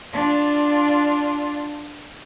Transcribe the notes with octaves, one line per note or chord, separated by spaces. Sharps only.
D4 F4